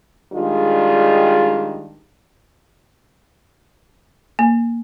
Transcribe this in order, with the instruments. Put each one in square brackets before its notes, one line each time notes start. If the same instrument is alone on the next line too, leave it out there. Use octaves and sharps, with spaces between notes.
[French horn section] D#3 G3 G#3 D4 F4 G#4
[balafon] A#3